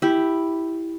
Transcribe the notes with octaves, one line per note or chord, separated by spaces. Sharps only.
E4 G4